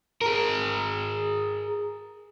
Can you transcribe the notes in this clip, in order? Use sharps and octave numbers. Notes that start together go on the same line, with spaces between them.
G#4 A#4